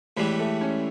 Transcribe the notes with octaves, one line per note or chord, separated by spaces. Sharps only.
A2 E3 G3 G#3
A3
C#4